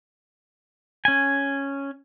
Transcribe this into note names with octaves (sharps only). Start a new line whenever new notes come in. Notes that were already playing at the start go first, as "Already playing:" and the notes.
C#4 G#5